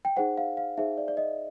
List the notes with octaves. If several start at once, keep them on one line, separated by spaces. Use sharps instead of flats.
G5
D#4 G#4 C5 F#5
F5
F5
D#4 G#4 C5 E5
D5
D5
D#5